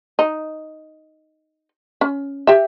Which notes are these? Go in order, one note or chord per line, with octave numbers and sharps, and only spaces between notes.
D#4
C#4
G4 E5